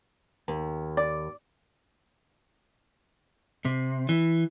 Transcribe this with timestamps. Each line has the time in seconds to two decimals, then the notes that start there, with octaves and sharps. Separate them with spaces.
0.48 D#2
0.97 D5
3.65 C3
4.09 E3